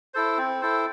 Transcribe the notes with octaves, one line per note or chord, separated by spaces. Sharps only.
E4 A4 C5
C4
E4 A4 C5